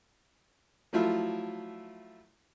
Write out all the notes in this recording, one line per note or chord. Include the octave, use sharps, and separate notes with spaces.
F3 F#3 A3 E4 F4